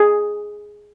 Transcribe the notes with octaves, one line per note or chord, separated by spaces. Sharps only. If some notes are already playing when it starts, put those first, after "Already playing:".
Already playing: G#4